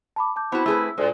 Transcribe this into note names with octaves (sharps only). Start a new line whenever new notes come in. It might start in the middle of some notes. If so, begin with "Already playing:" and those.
A5 B5 D6
A5 D6 G6
B3 C4 E4 F#4
A3 G#4 B4 E6
D2 A#2 G#3